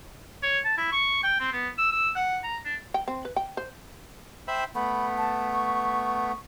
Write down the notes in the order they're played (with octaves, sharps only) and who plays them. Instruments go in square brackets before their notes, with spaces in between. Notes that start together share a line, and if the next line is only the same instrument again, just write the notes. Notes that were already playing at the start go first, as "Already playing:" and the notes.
[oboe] C#5
A5
E4
C#6
G5
C4
B3
E6
E6
F#5
A#5
D4
[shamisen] G5
C4
B4
G5
C5
[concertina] C5 E5 B5 [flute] G5
[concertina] A3 B3 [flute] B5
[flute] A5
C#6